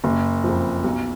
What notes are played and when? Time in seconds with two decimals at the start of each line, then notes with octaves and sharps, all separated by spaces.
0.04 F#1
0.44 F2 F3
0.84 B1